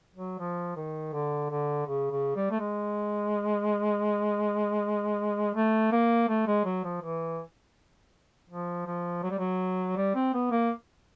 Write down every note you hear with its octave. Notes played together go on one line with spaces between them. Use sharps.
F#3
F3
D#3
D3
D3
C#3
C#3
G3
A3
G#3
A3
A#3
A3
G#3
F#3
F3
E3
F3
F3
F#3
G3
F#3
G3
C4
B3
A#3